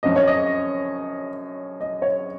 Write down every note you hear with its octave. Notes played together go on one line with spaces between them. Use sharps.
F#2 F3 D#5
C#5
D#5
D#5
C#5